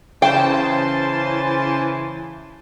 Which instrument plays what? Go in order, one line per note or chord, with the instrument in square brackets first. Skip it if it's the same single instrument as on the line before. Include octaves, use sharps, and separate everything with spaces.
[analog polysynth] C#3 C5 A5 [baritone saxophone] E3 [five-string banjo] G5